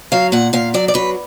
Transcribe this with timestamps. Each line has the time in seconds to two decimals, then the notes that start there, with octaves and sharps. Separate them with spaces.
0.12 F#3 F5
0.32 A#2 F#5
0.53 A#2 F5
0.74 F#3 D5
0.88 D5
0.94 F#3 B4